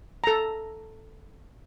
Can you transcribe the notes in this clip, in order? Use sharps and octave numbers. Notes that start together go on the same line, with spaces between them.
A4 A#5